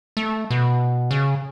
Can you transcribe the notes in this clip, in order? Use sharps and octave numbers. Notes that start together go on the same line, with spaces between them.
A3
B2
C#3